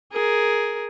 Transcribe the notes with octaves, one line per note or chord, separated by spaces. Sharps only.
G#4 A#4